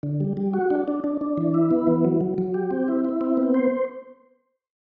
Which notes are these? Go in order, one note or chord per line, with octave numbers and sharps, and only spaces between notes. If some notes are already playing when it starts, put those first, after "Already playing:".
D3
G3
G3
F#4
D4
D4
D4
D4
E3
E4
B3
E3
F#3
F#3
F#3
G4
C4
E4
E4
C4
B3
C5